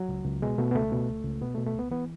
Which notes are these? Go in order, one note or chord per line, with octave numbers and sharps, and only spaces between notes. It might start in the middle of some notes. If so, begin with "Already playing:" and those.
Already playing: F#3
C#2
C#2
B2 G#3
B2 A3
B3
C#2 A3
B2
C#2
C#2
B2 B3
A3
B2
A3
C#2 B3
E3 B3